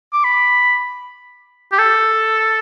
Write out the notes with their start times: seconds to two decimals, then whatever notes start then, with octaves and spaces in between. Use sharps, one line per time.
0.13 D6
0.24 B5
1.72 G4
1.79 A4